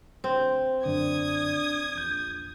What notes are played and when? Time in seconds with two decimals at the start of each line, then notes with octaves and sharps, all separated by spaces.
0.24 D2 C4
0.86 F#2 D3 D4 D#6 G#6
1.95 A#1 E2 G6